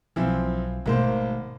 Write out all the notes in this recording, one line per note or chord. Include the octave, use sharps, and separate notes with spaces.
B1 E3 F3 C4
G#1 B2 A3 A#3 C5